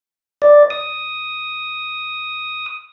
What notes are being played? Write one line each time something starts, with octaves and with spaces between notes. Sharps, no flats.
D5
D#6